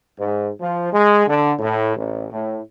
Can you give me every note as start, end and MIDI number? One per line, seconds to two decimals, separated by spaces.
0.19 0.50 44
0.61 0.92 53
0.93 1.24 56
1.27 1.53 50
1.59 1.95 45
1.97 2.26 33
2.32 2.59 45